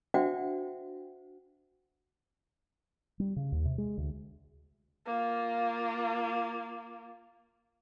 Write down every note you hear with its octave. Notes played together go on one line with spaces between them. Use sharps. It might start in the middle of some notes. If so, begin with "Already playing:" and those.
D4 F#4 C5 E5 F#5 G5
G3
C#3
D#2
C3
G#3
D2
A#3 F4